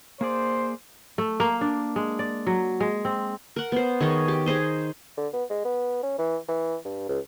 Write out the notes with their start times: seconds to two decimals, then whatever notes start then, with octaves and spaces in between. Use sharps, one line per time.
0.21 A#3 G#4 C5 D5
1.18 A3
1.40 A#3
1.61 D4
1.96 G#3
2.19 D5
2.47 F#3
2.80 G#3
3.05 C4
3.56 A#4 F#5
3.72 B3 C5
4.00 D#3 G#4 C#5 D#5
4.28 G4
4.46 D#4 G#4 C5 D#5
5.18 D3
5.34 B3
5.50 G#3
5.65 B3
6.03 C#4
6.19 E3
6.48 E3
6.85 G2
7.09 C#2